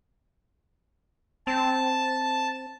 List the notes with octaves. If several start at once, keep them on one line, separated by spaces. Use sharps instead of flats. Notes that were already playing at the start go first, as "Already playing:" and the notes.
C4 A5